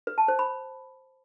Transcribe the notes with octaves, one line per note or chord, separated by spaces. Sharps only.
B4
A5
C5
B5